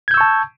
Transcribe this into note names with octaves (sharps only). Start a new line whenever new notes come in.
A5 C#6 E6 G6 G#6